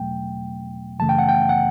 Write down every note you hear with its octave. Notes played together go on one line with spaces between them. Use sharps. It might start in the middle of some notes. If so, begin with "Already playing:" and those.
Already playing: E2 B2 F#3 A3 G5
F#2 C#3 E3 A3 A5
G5
F#5
G5
F#5